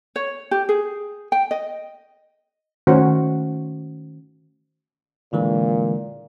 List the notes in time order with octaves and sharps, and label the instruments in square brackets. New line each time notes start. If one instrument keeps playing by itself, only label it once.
[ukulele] C#5
G4
G#4
G5
D#5
[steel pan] D#3 A3 C#4 F#4 C5
[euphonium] A#2 [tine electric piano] D3 E3 G#3